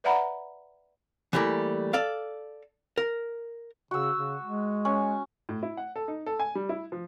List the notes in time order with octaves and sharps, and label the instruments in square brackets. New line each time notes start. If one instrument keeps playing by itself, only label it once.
[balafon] B4 D5 E5 F#5 A#5 B5
[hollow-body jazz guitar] E3 F3 G3 A3 A#3
A4 D5 F5
A#4
[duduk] C#3 [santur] F#4 E6
[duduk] C#3
G#3
[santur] C#4
[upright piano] A2
E4
F#5
A4
D#4
A4
G#5
G3
E4
F3